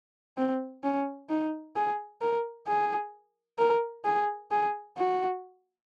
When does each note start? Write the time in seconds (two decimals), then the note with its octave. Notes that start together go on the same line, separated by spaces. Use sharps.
0.37 C4
0.83 C#4
1.29 D#4
1.76 G#4
2.21 A#4
2.67 G#4
3.59 A#4
4.05 G#4
4.51 G#4
4.97 F#4